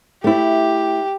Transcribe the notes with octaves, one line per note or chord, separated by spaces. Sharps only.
A3 E4 G4